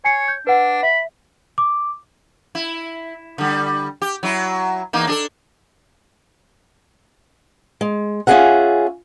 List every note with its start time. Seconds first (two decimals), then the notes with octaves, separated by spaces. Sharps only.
0.05 C#5 G#5 C7 C#7
0.28 G6
0.47 D4 B4 F#5
0.83 E5 B5
1.58 D6
2.55 E4
3.38 D3 G3
4.02 G4
4.23 F#3 E4
4.93 E2 A#3 D#4
5.07 D4 G#4 A4
7.81 G#3
8.27 C#4 F4 F#4 G#4 E5 F#5